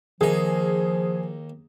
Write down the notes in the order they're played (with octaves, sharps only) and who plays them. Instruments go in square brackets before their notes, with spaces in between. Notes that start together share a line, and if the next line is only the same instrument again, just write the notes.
[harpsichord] D#2 D#4 [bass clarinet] F3 [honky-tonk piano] G#4